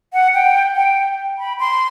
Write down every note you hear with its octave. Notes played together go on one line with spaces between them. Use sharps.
F#5
G5
G5
B5
C6